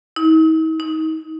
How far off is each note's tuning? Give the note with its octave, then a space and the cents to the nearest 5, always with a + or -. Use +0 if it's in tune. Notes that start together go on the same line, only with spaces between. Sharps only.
D#4 +45
D#4 +25